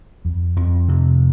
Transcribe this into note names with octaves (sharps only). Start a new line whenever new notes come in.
F2
F2
C3